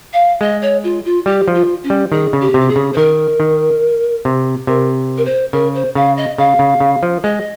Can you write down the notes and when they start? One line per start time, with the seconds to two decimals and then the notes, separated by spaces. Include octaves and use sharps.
0.13 F5
0.41 G#3 D#5
0.62 C#5
0.84 F4
1.05 F4
1.26 G3 G4
1.48 F3
1.55 F4
1.83 C#4
1.90 G3
2.12 D#3 G#4
2.33 C#3
2.41 G4
2.54 C3
2.61 G4
2.69 G#4
2.76 C#3
2.93 C5
2.97 D#3 A#4
3.40 D#3
4.25 C3
4.67 C3 A#4
5.18 A#4
5.25 C5
5.52 C#3 A#4
5.75 C5
5.95 C#3 F5
6.17 D#5
6.38 C#3 F5
6.59 C#3
6.80 C#3
7.03 F3
7.24 G#3 D#5